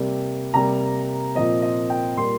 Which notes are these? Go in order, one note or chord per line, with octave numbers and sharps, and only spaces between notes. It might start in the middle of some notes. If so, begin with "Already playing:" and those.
Already playing: C3 G3 A#3
C3 G3 A#3 A#5
A#2 F3 C4 D#5
D#5
G5
A#2 G3 A#3 C6